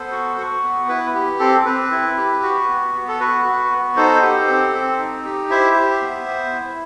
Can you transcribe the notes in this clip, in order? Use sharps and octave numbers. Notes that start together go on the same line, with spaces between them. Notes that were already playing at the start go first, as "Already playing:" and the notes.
Already playing: B3 A4 C5
F#4
F#4
B3
E4 B4
G4
C4 A4
C4 B4
E4
G4
F#4
B3
B3
A4
F#4 B4
F#4
B3
D#4 A4 C5
G4
C4
C4
D#4
G4
E4 C5 E5
G4
B3
B3
E4